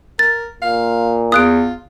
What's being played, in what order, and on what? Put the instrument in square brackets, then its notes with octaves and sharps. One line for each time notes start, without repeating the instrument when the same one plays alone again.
[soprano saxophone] A#4 [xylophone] A6
[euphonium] A#2 [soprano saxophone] F5
[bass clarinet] E2 [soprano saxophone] F4 [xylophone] D#6 F#6 D7